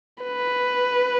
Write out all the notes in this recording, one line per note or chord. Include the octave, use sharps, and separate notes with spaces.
B4